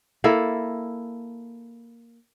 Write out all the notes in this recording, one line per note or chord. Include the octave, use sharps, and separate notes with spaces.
A#3 E4 A4